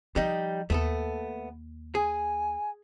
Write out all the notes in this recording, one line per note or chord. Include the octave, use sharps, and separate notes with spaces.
F3 G3 D#4
D#2 A3 B3 A4
G#4 G#5